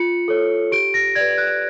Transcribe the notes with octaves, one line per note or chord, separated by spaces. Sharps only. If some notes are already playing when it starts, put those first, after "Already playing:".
Already playing: F4 C#7
A4 C#5
G4 D7
A#6
B4 D5 G#6
F#6